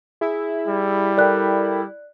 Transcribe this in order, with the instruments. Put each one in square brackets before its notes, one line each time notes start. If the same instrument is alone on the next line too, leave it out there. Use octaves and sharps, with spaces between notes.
[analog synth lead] E4 [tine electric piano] G#4
[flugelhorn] G3
[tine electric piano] A4 A#4 G5 [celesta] D5 F#6